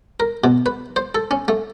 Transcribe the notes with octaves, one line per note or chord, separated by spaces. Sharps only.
A#4
B2
B4
C5
A4
C#4
A3